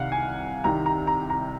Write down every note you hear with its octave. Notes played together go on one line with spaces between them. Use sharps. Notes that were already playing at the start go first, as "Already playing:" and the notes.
Already playing: C2 C3 D#3 F5 F#5
G#5
C2 C3 D#3 A#5
A#5
A#5
A#5